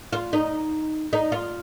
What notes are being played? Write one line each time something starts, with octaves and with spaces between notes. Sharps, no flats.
F4
D#4
D#4
F4